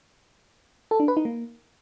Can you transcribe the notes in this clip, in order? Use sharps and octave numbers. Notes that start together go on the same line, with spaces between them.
A4
D4
B4
D#4
A#3